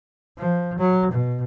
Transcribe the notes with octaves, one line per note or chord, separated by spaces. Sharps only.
F3
F#3
B2